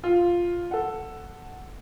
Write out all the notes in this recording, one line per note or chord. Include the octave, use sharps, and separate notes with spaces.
F4
A4 F#5